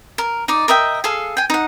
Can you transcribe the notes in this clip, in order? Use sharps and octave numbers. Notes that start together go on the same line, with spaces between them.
A#4
D#4 D5
A#4 D#5 E5 G5
G#4 A4 F5
G5 G#5
D#4 F#5